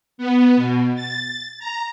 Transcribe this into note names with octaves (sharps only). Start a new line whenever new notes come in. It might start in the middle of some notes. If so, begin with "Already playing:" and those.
B3
B2
A6
A#5